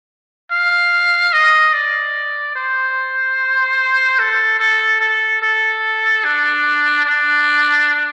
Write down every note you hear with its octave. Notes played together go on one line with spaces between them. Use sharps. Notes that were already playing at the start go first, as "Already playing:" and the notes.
F5
D#5
D5
C5
A4
A4
A4
A4
D4
D4